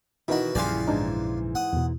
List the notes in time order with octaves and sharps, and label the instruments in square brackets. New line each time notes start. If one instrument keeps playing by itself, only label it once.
[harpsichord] B2 F#4 [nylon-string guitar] D#3 E3 [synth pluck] D#4 E4
[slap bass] A#1 F#2 C#3 [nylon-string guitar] E3 G3 [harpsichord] F4 G#4 D5
[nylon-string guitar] G#2 E3 [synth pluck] D4 D#4
[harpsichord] F#5 D#6
[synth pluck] E2 B2